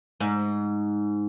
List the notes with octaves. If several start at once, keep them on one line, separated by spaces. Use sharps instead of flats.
G#2